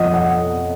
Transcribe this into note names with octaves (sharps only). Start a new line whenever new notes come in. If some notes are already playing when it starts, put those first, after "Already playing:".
Already playing: F2 F3 D#5 F#5
F#5